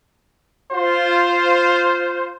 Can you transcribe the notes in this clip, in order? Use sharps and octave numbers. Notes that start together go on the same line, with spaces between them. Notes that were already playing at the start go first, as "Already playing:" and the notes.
F4 C5